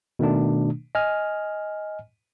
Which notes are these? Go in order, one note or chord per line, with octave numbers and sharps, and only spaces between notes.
B2 D#3 A3 D4
D#5 G#5 F6